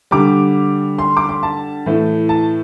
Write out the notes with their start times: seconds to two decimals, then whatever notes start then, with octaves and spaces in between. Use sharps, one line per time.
0.11 D3 G3 D6
0.98 C6
1.17 D6
1.29 C6
1.43 A5
1.86 A2 E3 A3
2.29 A5